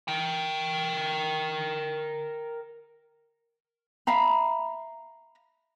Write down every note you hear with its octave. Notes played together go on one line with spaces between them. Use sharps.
A#4 G5
E5 F5 A#5 B5